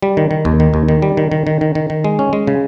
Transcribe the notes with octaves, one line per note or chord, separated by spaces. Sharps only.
G3
D#3
D#3
D#2
D#3
D#2
D#3
G3
D#3
D#3
D#3
D#3
D#3
D#3
G#3
C#4
G#3
C#3